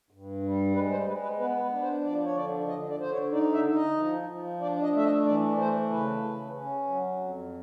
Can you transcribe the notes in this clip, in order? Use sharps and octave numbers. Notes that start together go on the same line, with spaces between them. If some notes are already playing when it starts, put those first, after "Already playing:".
G2
G3
G#3 B4
C5
G#3 B4
B4
B3 B4
B4
D4
C5
F3 D5
C#5
D3 D5
D3 D#5
D5
D3 C5
C#5
D#4 D5
E5
D#4
D#5
F3
F3
D4 D5
D#5
A3 E5
D#5
E3 D5
A3 C5
C#3 B4
C#3
C#4
F#3
F2